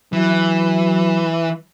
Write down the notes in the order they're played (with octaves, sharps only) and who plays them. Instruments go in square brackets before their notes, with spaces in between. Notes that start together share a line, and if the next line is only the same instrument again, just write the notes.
[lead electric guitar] E3 [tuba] F#3